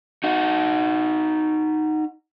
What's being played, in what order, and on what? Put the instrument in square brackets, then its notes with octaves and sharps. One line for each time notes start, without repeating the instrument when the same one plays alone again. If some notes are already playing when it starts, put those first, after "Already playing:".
[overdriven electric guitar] D#4 F#4